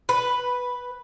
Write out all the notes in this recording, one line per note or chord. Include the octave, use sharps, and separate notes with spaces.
B4